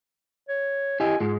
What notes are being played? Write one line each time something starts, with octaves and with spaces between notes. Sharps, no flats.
C#5
E4 G4 D#5 G#5
G#2 G#3 F4